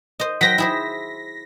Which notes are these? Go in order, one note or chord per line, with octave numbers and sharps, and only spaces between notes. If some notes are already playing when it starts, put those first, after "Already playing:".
C5 D#5
F#3 C5 G5 A#6 B6
E4 G#4 C5